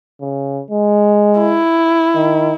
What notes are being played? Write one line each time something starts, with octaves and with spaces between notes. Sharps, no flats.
C#3
G#3
E4
D#3